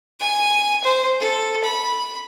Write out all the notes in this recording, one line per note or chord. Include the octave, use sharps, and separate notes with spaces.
G#5
C5
A4
B5